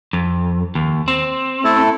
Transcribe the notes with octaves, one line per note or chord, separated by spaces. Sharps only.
F2
D#2
C4
A3 E4 A4